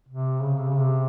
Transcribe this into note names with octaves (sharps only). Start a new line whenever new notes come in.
C3
C#3
C3
C#3
C3